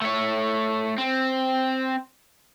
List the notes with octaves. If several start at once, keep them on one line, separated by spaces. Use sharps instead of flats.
A3 C#5
C4